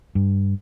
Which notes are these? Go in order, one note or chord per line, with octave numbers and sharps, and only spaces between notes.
G2